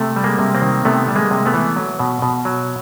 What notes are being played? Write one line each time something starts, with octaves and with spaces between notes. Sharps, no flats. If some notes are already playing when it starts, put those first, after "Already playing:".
Already playing: C3 A3
G3
G#3 A#3
C3
A#3 C4
D#3
C3 A3 B3
G3
G#3 A#3
C3
A3 B3
E3
F#3
B2
B2
F#3